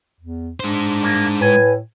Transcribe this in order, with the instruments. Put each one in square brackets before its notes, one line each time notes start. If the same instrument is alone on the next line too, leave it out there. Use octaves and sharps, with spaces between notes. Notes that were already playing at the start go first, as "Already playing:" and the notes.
[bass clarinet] E2
[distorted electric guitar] G#3 C5 [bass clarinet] D4
[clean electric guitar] G2 A#3
[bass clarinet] A2 [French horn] B4 [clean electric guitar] G#5